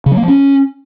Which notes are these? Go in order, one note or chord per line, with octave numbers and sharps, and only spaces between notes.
C#3
F#3
A#3
F3
C#4